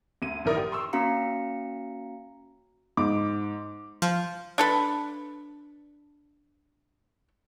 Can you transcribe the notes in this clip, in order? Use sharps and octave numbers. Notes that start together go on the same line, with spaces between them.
D2 D#7
A1 D#3 E4 A#4 D5 D#6
G4
C6 C#6 E6
A#3 C#4 F#4 F5 A#5 C#7
G#2 D6
F3
D4 A4 B4